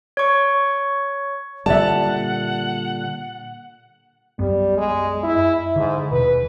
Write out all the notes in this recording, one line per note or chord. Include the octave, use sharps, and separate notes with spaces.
C#5 C#6
A#2 D3 G3 D5 E5 F#5 A5
F#2 G3 B3
G#3
E4
G#2 D3
D#1 B2 B4